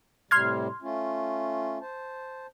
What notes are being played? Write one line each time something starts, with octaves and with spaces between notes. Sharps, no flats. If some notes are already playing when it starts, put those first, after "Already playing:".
A2 C3 G3 C6 F6 G#6
A3 C#4 F4
C5 A5